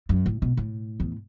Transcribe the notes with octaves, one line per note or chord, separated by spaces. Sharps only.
F#2
A2
B2
A2
E2